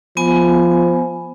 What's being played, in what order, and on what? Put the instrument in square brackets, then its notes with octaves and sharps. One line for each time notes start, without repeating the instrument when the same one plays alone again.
[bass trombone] F3 [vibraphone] B3 G#5